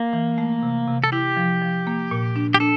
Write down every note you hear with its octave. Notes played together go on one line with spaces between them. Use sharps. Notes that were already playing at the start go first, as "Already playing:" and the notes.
Already playing: A#3
E3
A3
C3
C3
A4
E4 G4
F3
F3
A#3
A#2
D4
G4
D4 A4